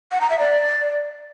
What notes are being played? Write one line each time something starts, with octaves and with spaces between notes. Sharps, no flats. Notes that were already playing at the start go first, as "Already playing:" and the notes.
F#5
A#5
E5
D5